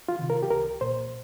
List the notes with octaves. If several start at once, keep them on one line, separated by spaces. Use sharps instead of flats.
F4
C3 D#3
A#4
G4
C2 A#4
A#2 C5